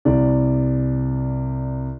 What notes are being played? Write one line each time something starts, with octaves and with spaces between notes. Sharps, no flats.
C2 D5